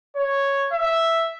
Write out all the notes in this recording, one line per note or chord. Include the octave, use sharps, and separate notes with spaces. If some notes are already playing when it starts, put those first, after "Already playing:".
C#5
E5